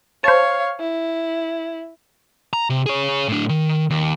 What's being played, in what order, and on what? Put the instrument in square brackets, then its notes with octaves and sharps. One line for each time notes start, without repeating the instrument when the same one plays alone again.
[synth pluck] C5 A5 [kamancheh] C#5 F5
[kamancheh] E4
[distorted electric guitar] A#5
C3
G#4 C#5
A2 D4
D#3
D#2